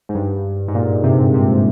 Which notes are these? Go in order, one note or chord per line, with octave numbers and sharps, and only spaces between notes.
G#2
G2
G#2
A#2
C3
C3